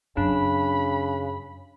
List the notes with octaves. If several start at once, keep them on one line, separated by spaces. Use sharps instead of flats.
F#2 C#3 D4 B5